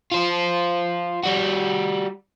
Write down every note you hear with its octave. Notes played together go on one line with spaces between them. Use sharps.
F4 C5
G3 F#4